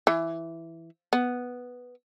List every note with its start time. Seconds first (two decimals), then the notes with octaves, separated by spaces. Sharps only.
0.07 E3
1.13 B3